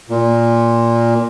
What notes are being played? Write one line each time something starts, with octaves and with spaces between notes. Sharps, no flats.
A#2